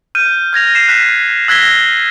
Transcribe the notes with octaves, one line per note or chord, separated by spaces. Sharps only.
F6 G6 D#7
F6 G#6 A#6 F7
C7 E7
F#6 B6
E6 F#6 G#6 A#6 B6 G7